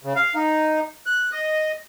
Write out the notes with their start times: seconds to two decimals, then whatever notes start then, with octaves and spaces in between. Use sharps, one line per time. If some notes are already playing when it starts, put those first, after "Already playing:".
0.04 C#3
0.16 F5
0.35 D#4
1.06 F#6
1.32 D#5